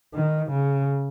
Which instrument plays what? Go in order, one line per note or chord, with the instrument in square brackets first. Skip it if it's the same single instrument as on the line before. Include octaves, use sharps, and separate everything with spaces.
[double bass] D#3
C#3